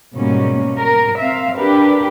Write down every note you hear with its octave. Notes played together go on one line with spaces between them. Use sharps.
G#2 B2 G3 G#3 A#3 C#4
A#4
C4 E5 F5
D4 G4 A#4 B4